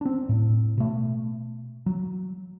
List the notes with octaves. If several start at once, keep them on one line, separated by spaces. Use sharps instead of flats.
C4 D4
A2
B2 A3
F#3